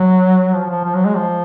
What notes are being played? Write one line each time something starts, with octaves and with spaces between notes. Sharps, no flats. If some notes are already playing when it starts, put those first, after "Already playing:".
Already playing: F#3
F3
F3
F3
F#3
G#3
F3